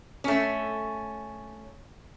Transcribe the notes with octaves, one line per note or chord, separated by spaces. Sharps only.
A3 C#4